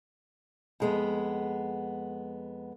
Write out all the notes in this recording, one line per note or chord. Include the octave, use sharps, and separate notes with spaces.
F2 G#3 B3